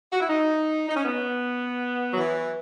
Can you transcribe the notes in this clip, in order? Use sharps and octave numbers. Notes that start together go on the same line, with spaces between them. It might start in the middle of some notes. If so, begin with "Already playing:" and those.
F#4
E4
D#4
D#4
C#4
B3
F#3
E3